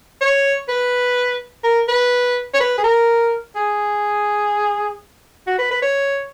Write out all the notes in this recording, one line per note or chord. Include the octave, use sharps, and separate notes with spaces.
C#5
B4
A#4
B4
C#5
B4
G#4
A#4
G#4
F#4
B4
B4
C#5